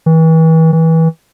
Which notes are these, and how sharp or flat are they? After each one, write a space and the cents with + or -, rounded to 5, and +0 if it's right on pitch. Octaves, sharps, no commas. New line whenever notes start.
E3 -35
E3 -25